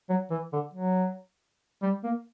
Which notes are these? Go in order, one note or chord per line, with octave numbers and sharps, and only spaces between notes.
F#3
E3
D3
F#3
G3
A#3